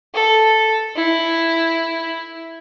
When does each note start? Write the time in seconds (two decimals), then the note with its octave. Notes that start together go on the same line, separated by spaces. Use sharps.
0.14 A4
0.96 E4